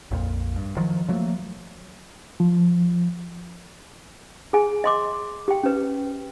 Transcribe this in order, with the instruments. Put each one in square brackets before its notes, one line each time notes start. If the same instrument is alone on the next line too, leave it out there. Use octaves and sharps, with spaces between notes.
[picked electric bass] A#1 F2 A#2
G2
D#3 F3 F#3
F3 F#3 A3 A#3
[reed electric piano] F3
[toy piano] G#4 G#5
D#5 C6 D6
G4 G5
C#4 B4